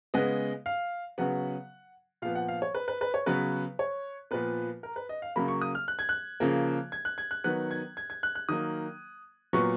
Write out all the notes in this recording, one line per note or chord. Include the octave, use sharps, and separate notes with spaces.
C#3 G#3 B3 D#5
F5
C#3 F#3 B3 F#5
A#2 F3 B3 F5
F#5
F5
C#5
B4
B4
B4
C#5
C#3 F#3 B3 B4
C#5
A#2 F3 B3 B4
A#4
B4
D#5
F5
C#3 F#3 A#3 B5
C#6
D#6
F6
F#6
G#6
F#6
C#3 F3 A#3
G#6
F#6
G#6
F#6
D#3 F#3 B3 F#6
G#6
G#6
G#6
F#6
F#6
D#3 F#3 A#3 D#6
A#2 F#3 B3 C#6